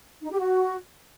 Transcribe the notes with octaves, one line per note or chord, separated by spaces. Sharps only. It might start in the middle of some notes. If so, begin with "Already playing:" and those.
D#4
G4
F#4